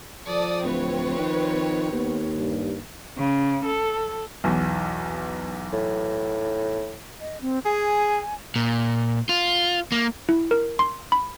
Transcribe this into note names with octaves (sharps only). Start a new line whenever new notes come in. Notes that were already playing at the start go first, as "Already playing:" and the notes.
F3 A4 D5 D#6
D1 C4 B4 C#5
D#3
D#2 B3
G2
C#3
A4
B1 E2
A2
D#5
C4
G#4 G#5
A#2
F4
A#3
E4
A#4
C6
B5